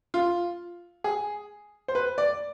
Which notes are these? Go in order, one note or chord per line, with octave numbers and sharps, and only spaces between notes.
F4
G#4
C5
B4
D5